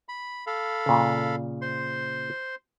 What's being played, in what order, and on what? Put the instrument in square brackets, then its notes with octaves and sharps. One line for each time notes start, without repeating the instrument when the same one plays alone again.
[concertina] B5
A4 F5 B5
[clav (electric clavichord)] A#2 C#3
[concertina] C5 C6